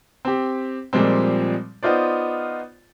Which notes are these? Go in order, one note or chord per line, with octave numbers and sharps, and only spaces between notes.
C4 G4
A#2 F3 G3 G#3 C4
B3 D#4 F4 C5 D5